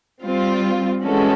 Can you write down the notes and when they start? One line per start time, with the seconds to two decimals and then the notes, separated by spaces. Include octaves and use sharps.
0.23 G3 C4 F4
1.04 E3 G#3 C#4 F#4 A4